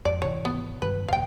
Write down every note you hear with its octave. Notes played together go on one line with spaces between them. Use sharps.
F2 G#2 F3 D5
G#1 C3 E3 C#5
B3
G2 D#3 F#3 B4
F#1 D#2 A#2 F5 G5